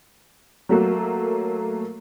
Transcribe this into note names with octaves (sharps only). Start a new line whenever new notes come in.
F#3 A3 A#3 F#4